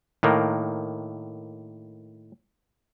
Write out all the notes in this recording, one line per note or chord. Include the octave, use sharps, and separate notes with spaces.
A2 D#3 A#3